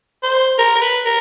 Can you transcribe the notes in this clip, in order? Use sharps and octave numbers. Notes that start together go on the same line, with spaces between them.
C5
A#4
A#4
B4
A#4